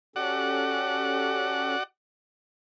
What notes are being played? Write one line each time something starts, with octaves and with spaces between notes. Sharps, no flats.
C#4 F#4 G4 A4 D5 F#5